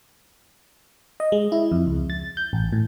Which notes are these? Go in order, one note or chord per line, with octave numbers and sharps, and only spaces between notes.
D#5
G#3
E4
F2
C#2
A6
G6
A1
A2